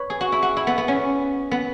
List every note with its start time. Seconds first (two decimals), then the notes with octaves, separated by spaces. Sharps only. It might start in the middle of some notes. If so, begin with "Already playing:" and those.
Already playing: B4 C#5
0.10 G#4
0.21 F#4
0.32 E4
0.42 F#4
0.57 E4
0.67 B3
0.78 B3
0.88 C#4
1.51 B3